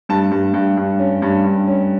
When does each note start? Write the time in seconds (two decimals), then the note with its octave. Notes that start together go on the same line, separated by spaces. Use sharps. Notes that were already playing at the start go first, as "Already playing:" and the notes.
0.09 G2 A5
0.31 G2
0.54 G2
0.77 G2
0.99 C#4
1.22 G2
1.44 G2
1.67 C#4